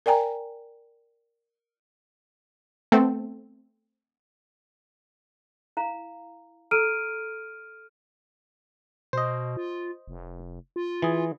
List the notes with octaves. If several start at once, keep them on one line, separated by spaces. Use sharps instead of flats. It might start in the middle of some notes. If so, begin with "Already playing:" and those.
A#4 D5 G5 G#5 A#5
A3 B3 C4 A4
E4 F5 A#5
A4 A#5 E6 F6 D7 D#7
B2 C5 D#5
F4
F1
F4
E3 G#4